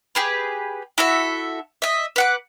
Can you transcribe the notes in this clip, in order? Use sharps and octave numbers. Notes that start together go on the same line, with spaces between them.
G4 G#4 B4
E4 F#4 A4 E5
D#5 E5
B4 F#5 D6